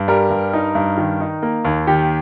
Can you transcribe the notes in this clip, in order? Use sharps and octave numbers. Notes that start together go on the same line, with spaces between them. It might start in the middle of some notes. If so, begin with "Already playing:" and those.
Already playing: G2
G3 A#4
G2
D#4
G2
D#3
D#4
A#3
D#2
D#3 G4